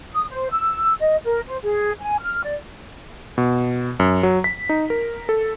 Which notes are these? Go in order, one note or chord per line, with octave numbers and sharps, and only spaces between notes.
D#6
C5
E6
D#5
A#4
C5
G#4
G#5
F6
D5
B2
F#2
F#3
B6
D#4
A#4
A4